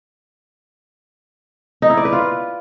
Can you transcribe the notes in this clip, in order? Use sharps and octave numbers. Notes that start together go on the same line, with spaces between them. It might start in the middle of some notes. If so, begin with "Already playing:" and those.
D#4
E4
D5
B4
F4